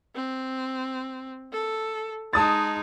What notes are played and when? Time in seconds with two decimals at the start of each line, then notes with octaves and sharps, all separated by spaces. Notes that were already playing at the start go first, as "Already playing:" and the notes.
0.16 C4
1.52 A4
2.33 G#3 D#4 A5 D#6 A6